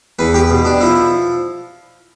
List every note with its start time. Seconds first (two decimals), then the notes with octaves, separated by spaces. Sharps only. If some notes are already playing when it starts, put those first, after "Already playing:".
0.19 E2 B4
0.34 G4
0.50 B2
0.65 D4
0.80 F3 E4